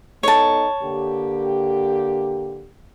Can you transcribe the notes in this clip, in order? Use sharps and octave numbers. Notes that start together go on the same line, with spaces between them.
B3 D#4 A4 C#5 A5
D3 A#3 G4